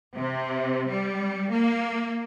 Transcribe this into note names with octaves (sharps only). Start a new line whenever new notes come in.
C3
G3
A#3